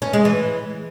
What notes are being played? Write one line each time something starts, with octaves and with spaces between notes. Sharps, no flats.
C#4
G#3
E3